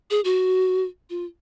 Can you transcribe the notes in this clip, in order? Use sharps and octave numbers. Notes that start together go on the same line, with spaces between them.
G#4
F#4
F4